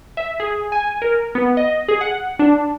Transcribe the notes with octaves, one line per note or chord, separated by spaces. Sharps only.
E5
G#4
G#5
A#4
B3
D#5
G#4
F#5
D4